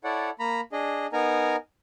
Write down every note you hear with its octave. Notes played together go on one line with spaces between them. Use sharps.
E4 A4 C#5 D5 F#5
A#3 A#5 B5
D4 G#4 D#5
B3 D#4 A#4 G#5 A#5